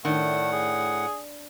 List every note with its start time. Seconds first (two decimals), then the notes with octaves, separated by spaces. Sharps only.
0.05 A2 D#3 A3 D4 F#5
0.52 G#4